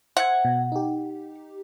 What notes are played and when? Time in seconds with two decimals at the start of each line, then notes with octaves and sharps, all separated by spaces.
0.17 C5 E5 F#5 G#6
0.45 B2
0.72 D#4 G4